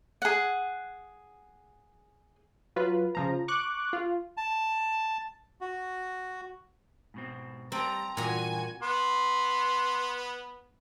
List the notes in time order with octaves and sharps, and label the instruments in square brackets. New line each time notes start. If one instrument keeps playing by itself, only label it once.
[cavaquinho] G#4 F#5
[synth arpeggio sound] F#3 F4 B4
C#3 F3 A#5
C#6 D6 F#6
F4
[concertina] A5
F#4
[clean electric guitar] G#2 B2 C4
[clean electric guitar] G3 G5 A5 [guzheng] C4 [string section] A#5
[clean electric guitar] G2 E3 A#4 [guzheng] A#2 A#5 [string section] F#4 G#5
[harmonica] B3 [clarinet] C6